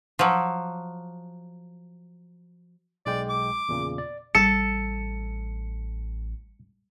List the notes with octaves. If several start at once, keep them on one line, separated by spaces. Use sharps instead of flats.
F3 F#3
B1 G#3 D5 G5
D6
E2 A#2 C#3
D5
A1 G3 A4 C#7